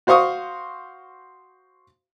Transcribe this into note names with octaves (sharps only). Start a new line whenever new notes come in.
F#4 C5 F5 C#6 D#6